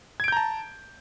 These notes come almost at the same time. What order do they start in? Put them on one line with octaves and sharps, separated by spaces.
G#6 D7 G6 A#5 A5